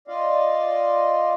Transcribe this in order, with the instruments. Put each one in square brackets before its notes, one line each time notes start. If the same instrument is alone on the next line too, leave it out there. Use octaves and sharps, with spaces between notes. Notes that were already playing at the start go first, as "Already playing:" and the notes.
[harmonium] F4 D5 D#5 F5